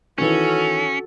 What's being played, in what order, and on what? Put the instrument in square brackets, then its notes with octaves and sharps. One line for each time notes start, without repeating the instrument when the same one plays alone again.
[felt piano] D#3 E3 [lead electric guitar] C#4 [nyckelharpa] F#4 A4